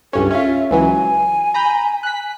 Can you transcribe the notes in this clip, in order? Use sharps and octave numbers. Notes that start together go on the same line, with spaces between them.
C#2 G2 C#4 A4
C#4 F4 E5
C#2 E3 F#3 G#5
A#5 B5 G6
F#6 B6